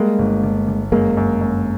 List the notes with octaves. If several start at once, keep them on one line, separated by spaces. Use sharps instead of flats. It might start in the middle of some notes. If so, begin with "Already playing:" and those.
Already playing: G3 G#3 A#3
G1
G1
G1
F#2 G#3 A#3
F#2
F#2